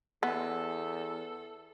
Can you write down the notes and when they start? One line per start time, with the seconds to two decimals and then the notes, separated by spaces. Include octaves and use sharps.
0.23 E2 B3 A4